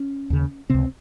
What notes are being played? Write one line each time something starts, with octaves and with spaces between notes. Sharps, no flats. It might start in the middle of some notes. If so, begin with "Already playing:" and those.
Already playing: C#4
D#2 C#3
C#2 C3 C4